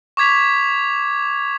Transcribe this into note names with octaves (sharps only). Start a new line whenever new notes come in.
C#6 D6 G#6 B6 F7